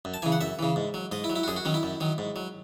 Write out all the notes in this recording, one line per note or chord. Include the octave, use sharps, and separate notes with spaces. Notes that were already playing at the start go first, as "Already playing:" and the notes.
F#2
A5
C#3 E3 G#5
F#5
F#2 E5
C#3 E3
G#2
F#3
G#2 D#5
E4
F#3
E4
F#4
F#2 G#4
F#4
D#3 F#3 C#4
E4
F#2
D#3 F#3
G#2
F#3